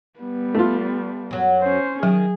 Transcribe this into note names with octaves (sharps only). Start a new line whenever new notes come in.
G3 B3
A3 F4
F#2 F#3
C#4 C5
D#3 F#3 G#4